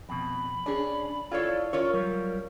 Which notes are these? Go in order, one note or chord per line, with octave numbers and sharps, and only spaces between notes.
F2 B2 B5
C#4 D4 G#4
E4 F4 A4 C#5 D5 F5
C#4 F4 A#4 C#5
F#3 G3 A#4